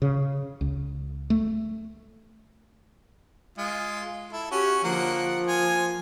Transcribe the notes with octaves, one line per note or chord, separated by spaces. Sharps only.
C#3
C#2
A3
G#3 F4
E4 A4
C#4 F#4 G4
D3 F3 A#3 F#5
A#3 F4 G#5